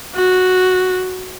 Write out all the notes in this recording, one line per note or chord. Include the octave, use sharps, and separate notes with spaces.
F#4